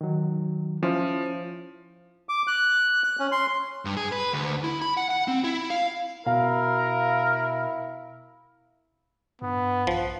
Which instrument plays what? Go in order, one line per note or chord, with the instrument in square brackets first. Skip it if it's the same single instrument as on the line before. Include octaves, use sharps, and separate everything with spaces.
[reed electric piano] D#3 F#3
[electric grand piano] F3 [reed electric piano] C#4 E4 C5
[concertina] D6
F#6
F#6
C#4
C6
[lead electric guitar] G2
G#4
B4
D2
E4
B5
F#5
F#5
C4
E4
F5
[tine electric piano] B2 [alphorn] E4 [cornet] A#4 [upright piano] F5
[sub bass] G2 [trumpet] B3
[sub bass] A#1 [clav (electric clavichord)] F3